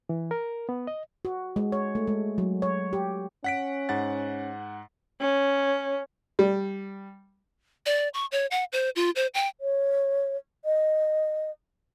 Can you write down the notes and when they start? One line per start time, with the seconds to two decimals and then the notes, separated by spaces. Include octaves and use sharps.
0.09 E3
0.31 A#4
0.69 B3
0.87 D#5
1.25 F#4
1.56 G#3
1.72 C#5
1.95 A3
2.07 G#3
2.38 F#3
2.62 C#5
2.93 G4
3.44 C#4 F#5 B6 D7
3.89 G#2 F#5 A6
5.21 C#4
6.39 G3
7.86 D5
8.14 C#6
8.32 C#5
8.51 F#5
8.72 C5
8.96 F4
9.16 C5
9.34 G5
9.61 C#5
10.65 D#5